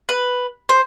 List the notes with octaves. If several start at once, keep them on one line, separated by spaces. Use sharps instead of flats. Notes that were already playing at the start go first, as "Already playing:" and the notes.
B4
C5